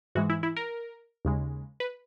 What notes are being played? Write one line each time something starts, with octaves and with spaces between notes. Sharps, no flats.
G#2 E3 G#3 F#4
E4
E4
A#4
D#2 C#3 G#3
B4